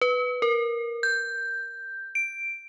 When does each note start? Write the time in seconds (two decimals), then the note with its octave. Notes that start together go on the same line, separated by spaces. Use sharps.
0.01 B4
0.42 A#4
1.03 G6
2.15 D7